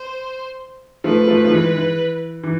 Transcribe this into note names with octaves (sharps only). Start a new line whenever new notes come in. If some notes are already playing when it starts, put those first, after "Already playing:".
Already playing: C5
F3 A3 B4
F3 A3
F3
E3 G#3
E3
E3